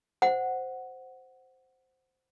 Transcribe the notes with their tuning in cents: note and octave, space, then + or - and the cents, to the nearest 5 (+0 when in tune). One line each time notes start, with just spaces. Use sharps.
C5 +0 F#5 +0